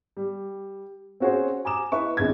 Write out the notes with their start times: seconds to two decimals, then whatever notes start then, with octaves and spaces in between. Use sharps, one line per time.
0.17 G3
1.20 C4 C#4 F#4 G#4 C5 C#5
1.65 G#5 A#5 D6 D#6 E7
1.92 E4 B4 D#5 C#6
2.17 G#1 C#2 G#6